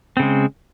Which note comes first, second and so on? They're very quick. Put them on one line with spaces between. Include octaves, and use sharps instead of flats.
C4 C#3 G#3